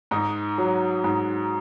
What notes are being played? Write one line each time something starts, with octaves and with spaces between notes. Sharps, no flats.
G#2 D#4
F#3
G#2